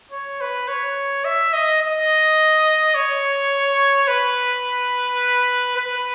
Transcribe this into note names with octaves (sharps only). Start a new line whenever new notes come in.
C#5
B4
C#5
E5
D#5
D#5
C#5
B4
B4